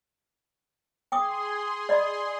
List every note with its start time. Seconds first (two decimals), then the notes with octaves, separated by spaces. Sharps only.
1.12 G#4 G5 C6 D6 D#6
1.89 D5 D#5 B5